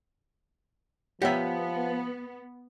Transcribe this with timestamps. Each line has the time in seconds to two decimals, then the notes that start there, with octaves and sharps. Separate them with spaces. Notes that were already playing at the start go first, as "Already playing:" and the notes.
1.22 F3 B3 G4 C#5 E5 F#5